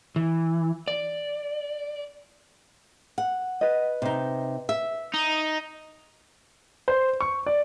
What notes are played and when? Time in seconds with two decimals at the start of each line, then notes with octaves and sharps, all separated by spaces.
0.16 E3
0.88 D5
3.18 F#5
3.61 B4 D#5
4.02 C3 D#4
4.69 E5
5.14 D#4
6.88 C5
7.21 C#6
7.46 D5